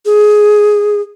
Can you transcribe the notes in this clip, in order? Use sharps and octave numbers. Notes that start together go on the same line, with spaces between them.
G#4